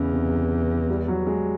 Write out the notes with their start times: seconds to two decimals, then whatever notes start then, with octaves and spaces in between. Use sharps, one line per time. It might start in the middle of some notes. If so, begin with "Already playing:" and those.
Already playing: E2 C#3
0.13 C3
0.89 G3
1.08 F#3
1.27 G#3